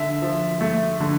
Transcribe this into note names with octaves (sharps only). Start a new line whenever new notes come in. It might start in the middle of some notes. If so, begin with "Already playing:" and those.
Already playing: D3 E5
F3
A3
D3